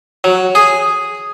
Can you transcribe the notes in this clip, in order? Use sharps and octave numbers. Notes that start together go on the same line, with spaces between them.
F#3
G#4